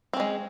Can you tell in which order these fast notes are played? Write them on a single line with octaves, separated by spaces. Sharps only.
C4 C#4 G#3